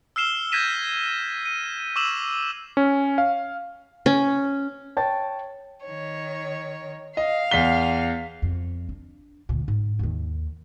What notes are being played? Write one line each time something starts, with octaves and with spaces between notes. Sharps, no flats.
E6 F6 C7 E7 G7
G6 G#6 A#6 B6 D#7 E7
D#7
C#6 D6 E6 E7 F#7
C#4
F5
C#4
C#5 G5 A5 A6
D#3 C#5
D#5 F5
E2 B6 G7
F2
D4
D2 A#2
G#2
D#2 D#3